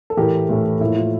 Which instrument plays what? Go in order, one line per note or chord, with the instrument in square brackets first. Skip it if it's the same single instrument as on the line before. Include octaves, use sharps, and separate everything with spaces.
[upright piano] A4
A2 E3 A3 G4 A#4
A2 E3 A3
A2 F3 A#3 E4
F4